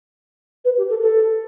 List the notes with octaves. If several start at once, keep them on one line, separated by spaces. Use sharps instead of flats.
B4
G4
A4
A4